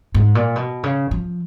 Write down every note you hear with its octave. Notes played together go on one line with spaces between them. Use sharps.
G#2
A#2
B2
C#3
F3